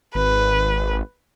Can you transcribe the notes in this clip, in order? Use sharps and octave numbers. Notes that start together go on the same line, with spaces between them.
G#1 B4